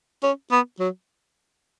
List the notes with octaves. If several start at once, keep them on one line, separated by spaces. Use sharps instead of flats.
C#4
B3
F#3